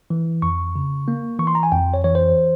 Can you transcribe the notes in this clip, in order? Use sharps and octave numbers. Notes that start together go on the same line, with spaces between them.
E3
F2 C#6
C#3
A#3
E3 C#6
C6
A#5
G#5
F2 G5
C#5
E3 C#5
C5